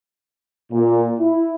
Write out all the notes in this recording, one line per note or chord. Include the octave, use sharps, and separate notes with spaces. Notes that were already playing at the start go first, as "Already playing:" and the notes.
A#2
E4